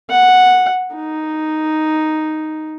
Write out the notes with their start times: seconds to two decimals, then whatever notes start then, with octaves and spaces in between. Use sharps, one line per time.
0.10 F#5
0.95 D#4